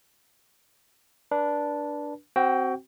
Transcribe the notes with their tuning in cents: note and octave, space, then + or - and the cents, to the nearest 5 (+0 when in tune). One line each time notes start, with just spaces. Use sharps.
D4 -5 B4 -35
C4 +0 F#4 +25 G5 +0